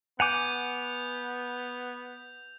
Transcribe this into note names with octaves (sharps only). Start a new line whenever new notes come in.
B3 F#5 G#5 D6 G6 F7